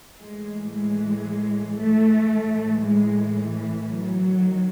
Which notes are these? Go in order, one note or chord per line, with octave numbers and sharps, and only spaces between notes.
A2 E3 G#3
G#3
A3
A2 E3
G#3
F#3
D#3